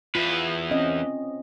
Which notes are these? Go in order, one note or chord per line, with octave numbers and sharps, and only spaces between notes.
E2 F4 B4
C4 C#4 D#5